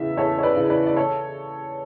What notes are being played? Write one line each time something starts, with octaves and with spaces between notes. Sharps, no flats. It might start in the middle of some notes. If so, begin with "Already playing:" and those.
Already playing: E2 C#3 E3 E5
E2 A4 C#5
C#5
B4 D5
C#3 E3
B4 D5
D5
A4 C#5